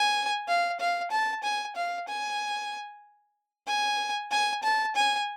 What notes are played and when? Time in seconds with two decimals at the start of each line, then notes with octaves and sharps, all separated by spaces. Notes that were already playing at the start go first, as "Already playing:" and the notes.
Already playing: G#5
0.49 F5
0.80 F5
1.11 A5
1.43 G#5
1.76 F5
2.08 G#5
3.67 G#5
4.31 G#5
4.63 A5
4.96 G#5